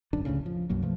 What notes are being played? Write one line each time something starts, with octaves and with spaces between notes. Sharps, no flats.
G#1 F#2 D3 D4
F1 C#2 A2 C#3
F3
B1 F#2 F#3 A#3
B2 F3 A3